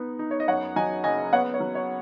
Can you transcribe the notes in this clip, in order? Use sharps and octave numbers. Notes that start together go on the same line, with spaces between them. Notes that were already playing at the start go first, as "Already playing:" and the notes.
Already playing: B3 D#4
D#4
C#5
D#5
F#2 C#5 F#5
F#3 D#5 G#5
F#1 D#5 G#5
B3 C#5 F#5
C#5
F#3
C#5